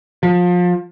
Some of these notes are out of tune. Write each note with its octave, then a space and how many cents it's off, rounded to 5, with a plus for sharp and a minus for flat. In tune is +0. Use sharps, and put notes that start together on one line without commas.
F3 +25